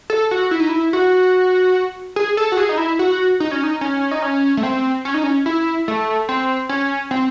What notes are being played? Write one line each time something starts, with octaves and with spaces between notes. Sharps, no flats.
A4
F#4
E4
D#4
E4
F#4
G#4
A4
F#4
G#4
D#4
E4
F#4
D#4
C#4
D#4
C#4
D#4
C#4
A3
C4
C#4
D#4
C#4
E4
A3
C4
C#4
C4